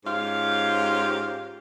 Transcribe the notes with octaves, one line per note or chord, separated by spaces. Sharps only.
G#2 C#4 F4 G4 F5